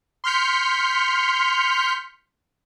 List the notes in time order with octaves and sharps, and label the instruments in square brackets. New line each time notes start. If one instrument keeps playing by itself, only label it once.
[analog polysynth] C6 F6 G6 B6 C#7